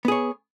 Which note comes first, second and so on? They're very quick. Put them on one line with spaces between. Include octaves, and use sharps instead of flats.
B3 G#4 C#5